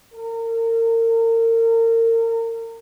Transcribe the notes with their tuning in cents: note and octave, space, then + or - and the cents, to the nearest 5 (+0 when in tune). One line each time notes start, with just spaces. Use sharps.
A#4 -35